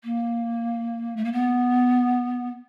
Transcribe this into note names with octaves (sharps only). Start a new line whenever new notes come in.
A#3
A3
A#3
B3